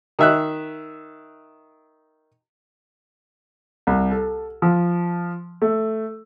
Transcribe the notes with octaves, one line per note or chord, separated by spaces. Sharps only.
D#3 E5 F#6
C2
A4
F3
A3